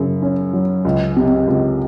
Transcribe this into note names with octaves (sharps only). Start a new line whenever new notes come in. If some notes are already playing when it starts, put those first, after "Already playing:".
Already playing: F#2 C#3
C#4
F#3
C#2
C3
C#2